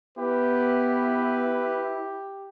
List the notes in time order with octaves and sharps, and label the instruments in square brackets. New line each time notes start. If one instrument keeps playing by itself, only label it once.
[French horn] B3 [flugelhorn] E4 [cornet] G4 [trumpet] B4